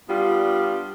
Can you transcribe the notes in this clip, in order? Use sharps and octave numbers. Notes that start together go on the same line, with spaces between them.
G3 B3 D4 F4